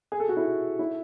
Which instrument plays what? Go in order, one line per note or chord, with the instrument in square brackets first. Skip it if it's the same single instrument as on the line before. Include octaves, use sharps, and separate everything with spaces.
[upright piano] G#4
A4
F#4
E4
E4